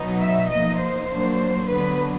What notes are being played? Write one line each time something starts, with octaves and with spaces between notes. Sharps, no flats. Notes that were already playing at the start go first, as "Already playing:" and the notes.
Already playing: B2 F#3 B3 D#4
E5
F3 A#3 D#4 D#5
C5
F#3 A#3 D4
D3 F#3 B3 D4 B4